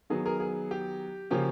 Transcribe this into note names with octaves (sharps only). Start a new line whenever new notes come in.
D#3 F#3 B3 G#4
G#4 A#4
G#4
G4
C#3 F3 A#3 C#4 G4